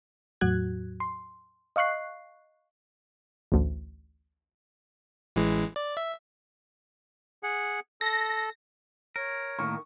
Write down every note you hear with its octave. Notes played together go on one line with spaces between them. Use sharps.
E2 A2 F#3 F#4 F#6 G#6
C6
D#5 F5 C#6 F#6 C7
A1 D2
A1 E3 G#3
D5
E5
G#4 F#5
A4 A#6
A#4 C#5
A2 D#3 A#3 C#6